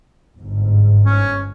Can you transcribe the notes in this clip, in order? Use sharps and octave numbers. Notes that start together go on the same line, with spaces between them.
G1 G#2
C#4